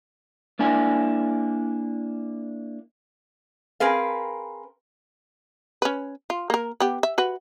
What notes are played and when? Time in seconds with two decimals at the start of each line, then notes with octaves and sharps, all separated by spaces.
0.59 A#3 D4 E4 G#5
3.80 C4 G#4 A#4 B4 F5
5.82 C#4 B4
6.30 F4
6.50 A#3 A#4
6.80 B3 G4
7.03 E5
7.18 F#4 B4